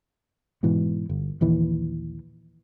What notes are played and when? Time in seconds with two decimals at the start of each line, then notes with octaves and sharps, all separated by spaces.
0.63 G#2 B2 E3
1.09 G1
1.41 A#1 D#2 E3